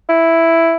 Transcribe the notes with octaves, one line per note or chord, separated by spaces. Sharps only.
E4